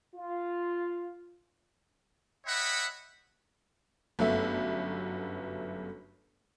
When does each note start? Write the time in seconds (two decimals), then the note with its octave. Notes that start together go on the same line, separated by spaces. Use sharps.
0.15 F4
2.47 C#5 D#5 E5 F#5 G5 B5
4.19 G1 F#2 A3 B3 E5